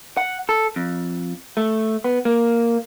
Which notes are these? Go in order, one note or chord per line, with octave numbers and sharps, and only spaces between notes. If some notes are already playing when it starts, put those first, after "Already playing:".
F#5
A4
F2
A3
B3
A#3